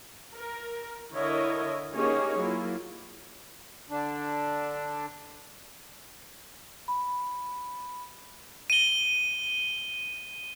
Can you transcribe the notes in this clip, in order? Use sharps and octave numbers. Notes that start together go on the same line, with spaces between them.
A#4
D3 E4 A#4 C#5 D#5
A#3 C#4 D#4 G4 G#4 C#5
F#3 A#3 E4 F4
D3 D4
B5
D#7 G7